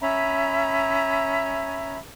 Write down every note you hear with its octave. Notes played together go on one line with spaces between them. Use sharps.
C#4 E5 A#5 B5